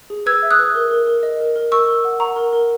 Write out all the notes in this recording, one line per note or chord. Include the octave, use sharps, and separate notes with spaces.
G#4
B4 E6 G#6
E5
D#6 F#6
B4
A#4
A#4
A#4
D#5
A#4
A#4
A#4 C#6 E6
A#4
F#5
F#5 A#5 C#6
A#4
A#4